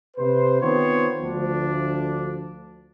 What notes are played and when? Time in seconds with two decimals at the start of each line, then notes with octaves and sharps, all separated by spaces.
0.17 C3 B4 C5
0.61 D#3 B3 C4 F4 C5 C#5
1.19 D2 F3 D4